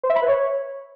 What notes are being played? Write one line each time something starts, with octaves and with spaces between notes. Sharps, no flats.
C5
E5
B5
B4
C#5